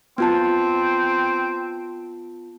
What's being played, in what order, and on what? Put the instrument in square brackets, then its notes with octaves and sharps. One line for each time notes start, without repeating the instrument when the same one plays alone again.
[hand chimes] B3 F4 A5 [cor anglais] C4